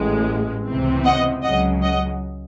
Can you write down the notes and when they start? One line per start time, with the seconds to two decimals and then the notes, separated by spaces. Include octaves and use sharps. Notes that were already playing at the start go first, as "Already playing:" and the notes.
Already playing: A1 A2 G#3
0.66 C#2 C3 E3 C4
1.05 D#5 F#5
1.44 C#2 C#3 F#3 D#5 F#5
1.83 D#5 F#5